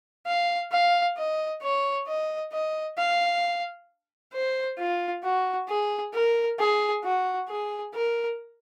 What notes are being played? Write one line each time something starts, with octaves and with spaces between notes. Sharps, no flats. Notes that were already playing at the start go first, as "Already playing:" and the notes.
F5
F5
D#5
C#5
D#5
D#5
F5
C5
F4
F#4
G#4
A#4
G#4
F#4
G#4
A#4